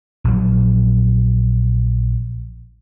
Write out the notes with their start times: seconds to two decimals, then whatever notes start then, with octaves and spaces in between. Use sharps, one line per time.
0.24 A#1 F#3